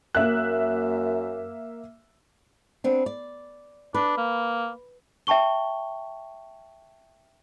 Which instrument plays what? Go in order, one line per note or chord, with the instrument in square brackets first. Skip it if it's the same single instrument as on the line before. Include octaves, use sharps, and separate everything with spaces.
[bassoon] F#2 [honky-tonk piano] A#3 E5 F#6
[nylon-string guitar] B3 C4 D4
D5
[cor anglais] D4 [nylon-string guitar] B4
[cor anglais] A#3
[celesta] E5 G5 A5 C#6 G7